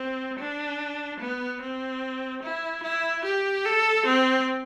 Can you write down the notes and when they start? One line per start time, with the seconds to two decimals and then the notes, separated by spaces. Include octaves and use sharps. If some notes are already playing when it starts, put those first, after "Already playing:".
Already playing: C4
0.39 D4
1.20 B3
1.62 C4
2.43 E4
2.84 E4
3.25 G4
3.65 A4
4.06 C4